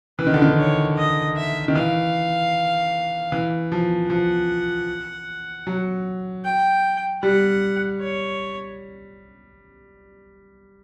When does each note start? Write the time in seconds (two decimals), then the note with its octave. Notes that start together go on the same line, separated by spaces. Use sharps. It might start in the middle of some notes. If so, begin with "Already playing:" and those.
0.19 E3 B4
0.27 D#3
0.34 D3
0.42 D#3
0.58 C#5
0.97 D#5
1.37 E5
1.68 D#3
1.75 E3 F5
3.32 E3
3.72 F3
4.10 F3 F#5
5.67 F#3
6.45 G5
7.23 G3 F#5
8.01 C#5